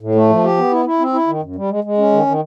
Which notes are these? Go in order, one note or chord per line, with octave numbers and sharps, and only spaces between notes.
A2
A3
F3
G4
B3
E4
E4
C4
E4
D#3
F#2
G3
G#3
G#3
C#4
D#3
D#3